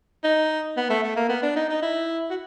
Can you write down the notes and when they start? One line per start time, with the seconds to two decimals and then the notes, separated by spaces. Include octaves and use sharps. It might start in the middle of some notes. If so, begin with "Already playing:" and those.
0.24 D#4
0.77 B3
0.90 A3
1.04 A3
1.16 A#3
1.29 B3
1.42 D4
1.56 D#4
1.69 D#4
1.82 E4
2.30 F#4